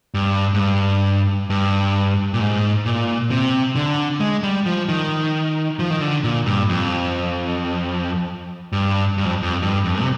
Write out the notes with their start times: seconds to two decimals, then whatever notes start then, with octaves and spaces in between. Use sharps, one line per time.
0.14 G2
0.54 G#2
0.59 G2
1.50 G2
2.34 A#2
2.40 G#2
2.86 A#2
3.31 C3
3.75 D3
4.20 G#3
4.43 G3
4.66 F3
4.89 D#3
5.79 F3
5.90 D#3
6.01 D3
6.24 A#2
6.46 G2
6.69 F2
8.72 G2
9.18 G2
9.25 F2
9.43 F2
9.62 G2
9.85 F2
10.02 C3